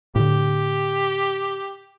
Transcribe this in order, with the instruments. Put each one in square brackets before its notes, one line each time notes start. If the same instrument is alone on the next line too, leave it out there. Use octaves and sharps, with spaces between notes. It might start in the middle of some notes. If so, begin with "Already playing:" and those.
[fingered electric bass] A2 D3 [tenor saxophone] G4